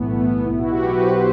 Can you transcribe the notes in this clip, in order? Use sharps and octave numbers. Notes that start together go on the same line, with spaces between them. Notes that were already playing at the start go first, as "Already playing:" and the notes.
Already playing: B1 A2 E3 A3 B3
B3
B3
B1 B2 E4
F#4
G4
B4
C5